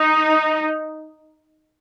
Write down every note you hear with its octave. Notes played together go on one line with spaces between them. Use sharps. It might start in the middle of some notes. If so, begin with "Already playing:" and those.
Already playing: D#4